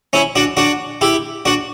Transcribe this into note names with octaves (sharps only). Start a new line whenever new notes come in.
C#4 E4
D4 F#4
D4 F#4
E4 G4
D4 F#4